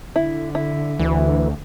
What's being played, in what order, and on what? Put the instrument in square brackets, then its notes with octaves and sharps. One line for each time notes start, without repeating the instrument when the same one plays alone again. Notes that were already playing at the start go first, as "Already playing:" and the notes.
[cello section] D3 [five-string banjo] E4
[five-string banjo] E4
[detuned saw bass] D2 [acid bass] E3